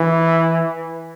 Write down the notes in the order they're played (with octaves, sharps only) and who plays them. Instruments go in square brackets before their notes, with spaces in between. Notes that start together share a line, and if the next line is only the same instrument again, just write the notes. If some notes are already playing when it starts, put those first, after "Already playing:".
Already playing: [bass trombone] E3